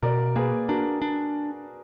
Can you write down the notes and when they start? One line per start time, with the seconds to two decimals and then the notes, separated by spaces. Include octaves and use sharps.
0.02 B2 A#4 D5
0.36 A#3 G#4 B4
0.68 D4 F#4 A#4
1.02 D4